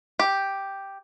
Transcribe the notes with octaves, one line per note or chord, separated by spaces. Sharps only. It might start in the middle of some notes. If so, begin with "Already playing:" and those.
G4